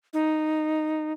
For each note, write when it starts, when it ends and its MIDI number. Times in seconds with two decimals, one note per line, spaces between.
0.13 1.12 63